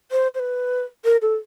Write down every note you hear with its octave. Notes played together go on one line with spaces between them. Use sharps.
C5
C5
B4
A#4
A4